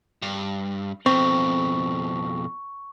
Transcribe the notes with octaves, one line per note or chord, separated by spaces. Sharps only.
G2
F2 B2 C4 C#6